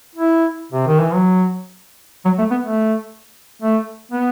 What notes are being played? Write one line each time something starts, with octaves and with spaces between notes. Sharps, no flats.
E4
C3
D#3
E3
F#3
F#3
A3
B3
A3
A3
B3